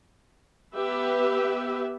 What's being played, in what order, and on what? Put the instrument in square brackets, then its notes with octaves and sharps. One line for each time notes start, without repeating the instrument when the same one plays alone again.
[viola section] B3 G4 B4 E5